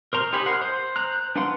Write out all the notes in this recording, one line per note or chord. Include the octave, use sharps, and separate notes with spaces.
A#4 C5 A#5 C6
D#4 G4 C5 G#5 B5
A#4 F#5 C6
C5
C5 A#5 F#6
D4 B4 F5 F#5 C6